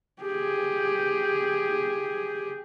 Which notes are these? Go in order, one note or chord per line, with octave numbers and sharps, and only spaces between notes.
G4 G#4